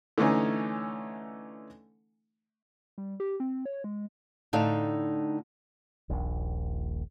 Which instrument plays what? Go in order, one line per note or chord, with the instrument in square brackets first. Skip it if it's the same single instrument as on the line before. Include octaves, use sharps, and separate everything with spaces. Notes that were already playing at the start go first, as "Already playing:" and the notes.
[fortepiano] D3 E3 A3 C#4 D#4
[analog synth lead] G3
G4
C4
C#5
G#3
[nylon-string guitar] A2 D3 D#4 A4 D5 F5
[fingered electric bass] D#1 A#1